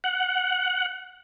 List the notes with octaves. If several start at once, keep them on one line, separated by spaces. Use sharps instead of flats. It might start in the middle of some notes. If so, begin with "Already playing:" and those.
F#5